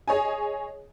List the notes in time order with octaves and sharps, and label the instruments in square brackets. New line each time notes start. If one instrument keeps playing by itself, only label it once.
[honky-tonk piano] G#4 C#5 D#5 G#5